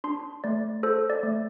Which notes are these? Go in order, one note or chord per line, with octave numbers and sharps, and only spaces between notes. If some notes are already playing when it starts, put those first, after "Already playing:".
D4 C6
A3 D5
A4 C5
D5
A3